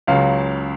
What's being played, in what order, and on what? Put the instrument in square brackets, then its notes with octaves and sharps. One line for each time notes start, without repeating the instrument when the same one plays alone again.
[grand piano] C#2 C#3 F#3 F5